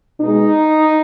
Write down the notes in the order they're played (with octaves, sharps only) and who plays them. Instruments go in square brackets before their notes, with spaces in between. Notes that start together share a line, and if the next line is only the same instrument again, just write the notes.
[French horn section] B2 G#3 D#4